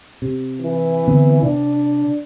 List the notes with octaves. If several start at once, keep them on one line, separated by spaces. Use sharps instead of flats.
C3
E3
D3 B3 C4
C3 D4